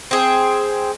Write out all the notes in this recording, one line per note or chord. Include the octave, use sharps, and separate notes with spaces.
C4 G#4